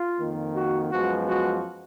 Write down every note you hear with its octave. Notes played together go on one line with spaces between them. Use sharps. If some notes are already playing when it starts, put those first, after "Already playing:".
Already playing: F4
F2 D#3 A#3
F#4
F#2 F3 G#3 B3 F#4
F#4